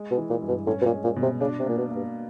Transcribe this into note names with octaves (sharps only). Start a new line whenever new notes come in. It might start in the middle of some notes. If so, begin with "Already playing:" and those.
Already playing: G#3
B2
E3
A#2
G2
B2
A2 C#4
B2
A#2
G#3
A#2
B2
C3
C#3 D4
C3
A#2 A#3
B2
A#3
G2